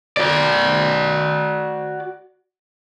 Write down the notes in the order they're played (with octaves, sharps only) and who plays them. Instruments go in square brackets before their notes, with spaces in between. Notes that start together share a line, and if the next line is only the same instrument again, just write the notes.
[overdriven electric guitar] F#4 D5